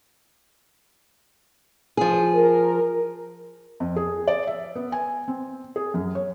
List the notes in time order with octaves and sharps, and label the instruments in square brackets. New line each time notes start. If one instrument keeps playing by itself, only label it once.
[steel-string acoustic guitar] F3 G#4
[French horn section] A#4
[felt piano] F2
G#4
D5
E5
B3
G#5
C4
G#4
F#2
C#5